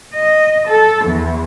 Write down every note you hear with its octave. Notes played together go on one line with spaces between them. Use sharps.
D#5
A4
E2